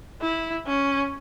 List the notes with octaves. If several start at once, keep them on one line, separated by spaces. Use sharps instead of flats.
E4
C#4